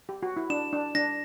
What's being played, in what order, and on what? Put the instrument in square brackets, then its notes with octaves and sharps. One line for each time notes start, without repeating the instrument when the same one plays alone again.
[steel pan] G4
F#4
E4
[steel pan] D4 [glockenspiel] E7
[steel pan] D4
[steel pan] D4 [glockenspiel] A#6